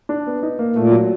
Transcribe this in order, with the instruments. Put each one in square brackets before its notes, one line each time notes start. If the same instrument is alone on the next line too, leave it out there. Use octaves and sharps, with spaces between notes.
[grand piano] D4
B3
D#4
A#3
[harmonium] A#2 [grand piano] A3
[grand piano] F#3